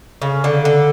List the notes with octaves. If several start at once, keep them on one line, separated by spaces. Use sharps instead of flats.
C#3
D3
D3